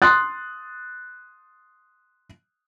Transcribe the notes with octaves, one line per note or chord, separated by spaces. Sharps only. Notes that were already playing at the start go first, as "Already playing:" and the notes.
C6 D#6 F#6 A6